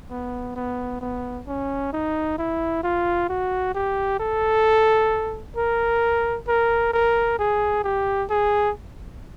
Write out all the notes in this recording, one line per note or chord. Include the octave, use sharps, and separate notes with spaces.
B3
B3
B3
C#4
D#4
E4
F4
F#4
G4
A4
A#4
A#4
A#4
G#4
G4
G#4